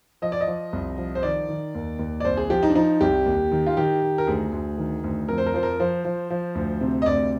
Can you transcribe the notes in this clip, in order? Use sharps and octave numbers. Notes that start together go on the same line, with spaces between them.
F3 D#5
D5
D#5
F3
C2
F3
C5
D#3 D5
D#3
D#2
D#2
D5
C2 C5
G#4
F3 G4
D#4
D4
F3 D#4
C2 G4
D#2
D#3
F4
D#3 G4
D#3
A#4
D2 G#4
D2
D#3
D2
F2 A#4
C5
A#4
F3 C5
A#4
F3 C5
F3
F3
D2
C3
D#5
D2 D5